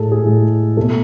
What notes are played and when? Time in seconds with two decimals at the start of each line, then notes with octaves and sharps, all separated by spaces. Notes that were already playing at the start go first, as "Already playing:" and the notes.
Already playing: A2 G#3 G#4 A4
0.12 G#4
0.24 A2 G#3
0.77 B2 A3 A4